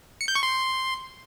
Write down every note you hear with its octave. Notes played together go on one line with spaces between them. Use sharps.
C#7
G6
C#6
C6